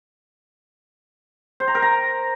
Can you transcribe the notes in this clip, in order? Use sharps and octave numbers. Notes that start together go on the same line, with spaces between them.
C5
A#5
A#4
A#5